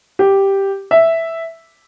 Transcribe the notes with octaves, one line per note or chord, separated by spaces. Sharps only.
G4
E5